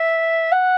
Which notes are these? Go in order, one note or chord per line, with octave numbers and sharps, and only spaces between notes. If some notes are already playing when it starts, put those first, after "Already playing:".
Already playing: E5
F#5